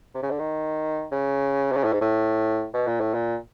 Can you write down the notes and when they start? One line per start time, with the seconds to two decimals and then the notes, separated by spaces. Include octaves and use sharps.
0.15 C3
0.22 C#3
0.30 D3
0.39 D#3
1.11 C#3
1.72 C3
1.76 C#3
1.84 A2
1.93 G#2
2.01 A2
2.74 B2
2.87 A#2
3.00 A2
3.14 A#2